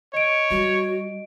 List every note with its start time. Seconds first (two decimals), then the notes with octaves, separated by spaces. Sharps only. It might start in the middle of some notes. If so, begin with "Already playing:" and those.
0.14 C#5 D#5 D7
0.50 G3 F#4